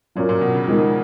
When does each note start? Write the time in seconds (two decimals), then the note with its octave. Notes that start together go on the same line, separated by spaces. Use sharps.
0.16 A#2 F#3 C#4 F4 A#4
0.29 A#2
0.41 B2
0.54 C#3
0.67 D#3 F3 G#3 D#4 A#4